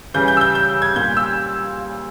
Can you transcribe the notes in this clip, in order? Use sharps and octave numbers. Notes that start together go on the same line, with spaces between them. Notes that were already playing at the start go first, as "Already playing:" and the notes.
C#3 E3 G3 G6
G6
E6
G6
G6
G#6
A#2 G3 G6
E6